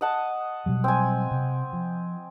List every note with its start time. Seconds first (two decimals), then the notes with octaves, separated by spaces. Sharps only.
0.01 D#5 F#5 A5
0.66 B2 F#3 G3
0.84 C4 G#5
1.31 C3
1.73 F3